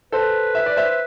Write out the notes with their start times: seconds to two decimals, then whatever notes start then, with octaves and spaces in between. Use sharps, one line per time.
0.12 A4 B4 C5
0.55 E5
0.66 D5
0.77 C5 E5